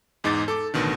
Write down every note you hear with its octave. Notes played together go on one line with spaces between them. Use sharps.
E2 G#2 D#4 D6 A6
A4 D6
A1 B2 D3 D#3